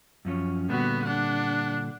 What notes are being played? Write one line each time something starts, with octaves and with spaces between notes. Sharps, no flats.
F#2 F3 C#4
A#2 D3 G3 B3 F#4
D4 F#5